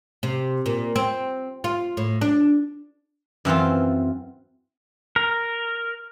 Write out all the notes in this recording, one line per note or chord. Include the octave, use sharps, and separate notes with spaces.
C3
A#2
C4
F4
A2
D4
F#2 E3 C4 F4
A#4